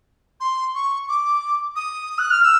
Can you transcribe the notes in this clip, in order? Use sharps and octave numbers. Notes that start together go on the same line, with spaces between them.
C6
C#6
D6
D#6
F#6
F6
E6